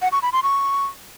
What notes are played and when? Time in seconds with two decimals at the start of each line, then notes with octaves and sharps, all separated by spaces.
0.02 F#5
0.12 C#6
0.22 B5
0.33 C6
0.43 C#6